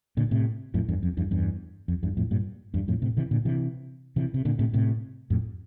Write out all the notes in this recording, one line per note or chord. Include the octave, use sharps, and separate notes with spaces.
A#2 D3
A2 C3
F2 A2
E2 G2
F2
E2 G2
E2 G2
F2
E2 G2
F2 A2
G2 A#2
E2 G2
F2 A2
A2 C3
C3 E3
A#2 D3
C3 E3
C3 E3
C3
A#2 D3
A2 C3
A2 C3
F2 A2